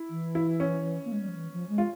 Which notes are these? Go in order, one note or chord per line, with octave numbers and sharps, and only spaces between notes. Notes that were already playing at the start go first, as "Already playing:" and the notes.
Already playing: E4
E3
E4
C#4
A#3
G#3
G3
F3
E3
F3
G#3
F4